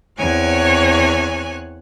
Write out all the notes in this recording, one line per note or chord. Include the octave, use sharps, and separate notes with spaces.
E2 C4 C#5 G#5 F#6